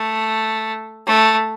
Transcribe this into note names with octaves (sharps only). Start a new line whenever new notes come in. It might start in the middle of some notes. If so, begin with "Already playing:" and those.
Already playing: A3
A3